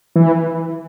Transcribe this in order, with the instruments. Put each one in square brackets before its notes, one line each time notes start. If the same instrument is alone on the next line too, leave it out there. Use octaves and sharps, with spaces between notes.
[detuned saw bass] E3